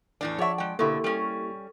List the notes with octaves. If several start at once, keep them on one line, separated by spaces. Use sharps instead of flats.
E2 A2 D4
F3 G#4 C#5 D5 E5 F#5 A5 C#6
G#3 G5
B2 D3 A#3 E4 F#4 G4 A4 C#6
G3 C#4